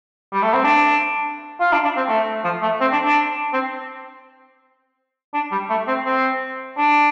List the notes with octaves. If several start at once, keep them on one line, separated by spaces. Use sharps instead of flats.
G3
A3
C4
D4
F4
D4
D4
C4
A3
F3
A3
C4
D4
D4
C4
D4
G3
A3
C4
C4
D4